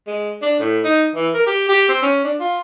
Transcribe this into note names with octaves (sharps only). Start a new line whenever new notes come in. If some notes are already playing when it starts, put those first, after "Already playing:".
G#3
D4
A2
D#4
E3
A#4
G4
G4
C4
C#4
D4
F4